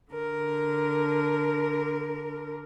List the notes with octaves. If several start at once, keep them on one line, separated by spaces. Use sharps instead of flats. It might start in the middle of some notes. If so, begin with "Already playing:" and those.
D3 A#4